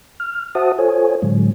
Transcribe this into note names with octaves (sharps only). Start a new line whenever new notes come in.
F6
F#4 C5 E5 F#5 A5 D#6
F4 A4 C5 C#5 G#5
A2 D3 F#3 G#3